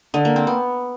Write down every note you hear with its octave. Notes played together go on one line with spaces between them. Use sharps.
D3
A#3
C4
B3